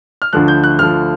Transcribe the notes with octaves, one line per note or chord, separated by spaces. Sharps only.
F6
D2 D3 F3 F#6
G6
F#6
D2 D3 F3 F6